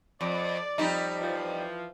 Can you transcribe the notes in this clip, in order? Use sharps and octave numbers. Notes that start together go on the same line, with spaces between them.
F2 D5
F2 G3 D#4
E3 F3